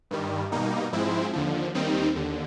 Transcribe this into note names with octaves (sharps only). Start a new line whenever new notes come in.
G2 D#3 G3
B2 G3 A#3 D#4
G#2 F3 G#3 C4 E4
D#2 D3 F3
D#2 D#3 G3 C4 D#4
D#2 D3